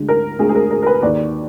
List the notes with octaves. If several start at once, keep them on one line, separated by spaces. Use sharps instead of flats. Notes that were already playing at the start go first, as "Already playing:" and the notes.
Already playing: D2 D3 G#3
A#4
D2 D3 G#3 G#4
G#4
A#4
A#4
A#4
B4
D#2 D#3 A#3 D5